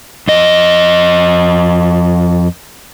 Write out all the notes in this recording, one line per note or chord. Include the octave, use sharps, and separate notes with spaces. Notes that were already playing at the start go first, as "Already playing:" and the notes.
F2 D#5